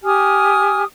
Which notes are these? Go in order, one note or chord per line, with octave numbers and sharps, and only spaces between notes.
G4 G#5 D#6 F6